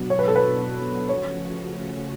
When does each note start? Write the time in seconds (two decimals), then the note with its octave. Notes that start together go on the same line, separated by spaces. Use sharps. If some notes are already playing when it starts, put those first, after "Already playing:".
Already playing: B2 F#3 B3 D4 F#4
0.10 C#5
0.19 B4
0.28 A4
0.36 B4
1.09 C#3 F3 A3 C#4 F#4 C#5